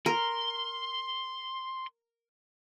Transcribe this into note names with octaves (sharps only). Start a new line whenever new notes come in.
A#4 C6